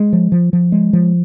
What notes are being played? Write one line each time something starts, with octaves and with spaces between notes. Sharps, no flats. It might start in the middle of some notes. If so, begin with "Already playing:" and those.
Already playing: G#3
F3
F3
F3
G#3
F3